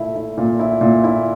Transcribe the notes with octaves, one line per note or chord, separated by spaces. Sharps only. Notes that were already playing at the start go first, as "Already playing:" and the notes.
Already playing: A#2 A3 E4
E4
A#2
E4
A#2
E4